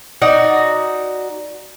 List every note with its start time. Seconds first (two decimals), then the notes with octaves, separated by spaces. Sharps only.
0.22 D#4 F#4 D5